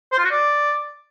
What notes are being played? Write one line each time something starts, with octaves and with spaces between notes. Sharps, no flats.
C5
F4
F#4
D5